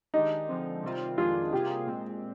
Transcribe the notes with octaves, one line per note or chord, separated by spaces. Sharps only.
D#3 G#3 D4 D#4 G4
D3 F3 G#3 C4
C3 D#3 G3 C4 F4
F2 D#3 G#3 D4 F4 G#4
C3 G3 A#3 F4 G4 G#4
A#2 G#3 C4